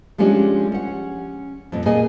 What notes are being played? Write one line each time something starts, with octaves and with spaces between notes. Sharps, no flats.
F3 G#3 A3 C#4 D4 G4
C#4 F#5
F2 A#2
A#2 A#3 G#4 D#5 G#5